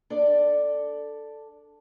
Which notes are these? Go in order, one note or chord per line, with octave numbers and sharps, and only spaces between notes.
D4 A4 D5